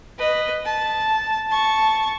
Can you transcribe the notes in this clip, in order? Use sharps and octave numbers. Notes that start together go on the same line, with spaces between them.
B4 D#5
A5
A5 C#6